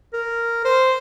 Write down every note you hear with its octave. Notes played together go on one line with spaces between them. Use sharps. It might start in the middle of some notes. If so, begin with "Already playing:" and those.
A#4
C5